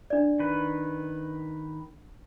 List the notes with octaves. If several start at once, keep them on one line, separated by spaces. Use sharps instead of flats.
D4 D5
D#3 B4